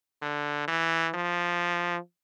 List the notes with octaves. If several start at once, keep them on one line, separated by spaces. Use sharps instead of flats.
D3
E3
F3